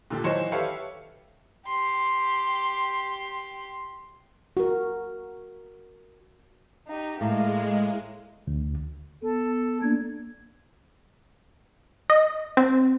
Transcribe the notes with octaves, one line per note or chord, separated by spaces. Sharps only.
A#2 D3 D4 G4
D#3 E3 F#3 C5 C#5 E7
G4 A4 B4 C#5 E5 F5
G4 C6
F#4 A#4
D#4 G4
A2 G#3 A#3
D2
B3 A4
A#3 D4 D5 G#6
D#5
C4